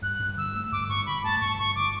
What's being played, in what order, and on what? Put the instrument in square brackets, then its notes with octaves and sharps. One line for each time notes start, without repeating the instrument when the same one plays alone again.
[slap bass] G2 [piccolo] F#6
[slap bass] G2
[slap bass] D3 [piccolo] E6
[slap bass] A3
[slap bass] G2 [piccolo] D6
[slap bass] G2 [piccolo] C#6
[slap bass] D3 [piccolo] B5
[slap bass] A3 [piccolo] A5
[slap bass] G2 [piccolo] C#6
[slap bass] G2 [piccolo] C#6
[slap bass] D3 [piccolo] D6